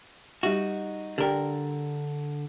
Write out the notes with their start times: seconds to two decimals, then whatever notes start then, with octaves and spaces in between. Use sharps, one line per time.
0.43 G3 D#4 F#4 G4 E5
1.18 D3 G4 A#4 D5 G5